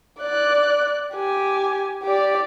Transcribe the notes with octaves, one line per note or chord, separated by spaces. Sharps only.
D5 F#6
G4 G#5
G4 D5